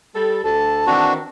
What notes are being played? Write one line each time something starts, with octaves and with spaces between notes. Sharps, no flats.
G3 A4
D2 A4 A5
D#3 E3 C4 D4 F#4